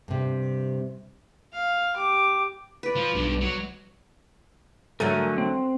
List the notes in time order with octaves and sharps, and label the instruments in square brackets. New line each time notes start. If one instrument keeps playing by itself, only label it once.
[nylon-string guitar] G2 C3
[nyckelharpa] F5
G4 D6
[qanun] B4 D5
[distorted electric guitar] F3 F4
[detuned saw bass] B1 [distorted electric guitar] G2
[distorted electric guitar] F#3
[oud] D3 F#3 A3 [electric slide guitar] A#4 G#5
[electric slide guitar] C4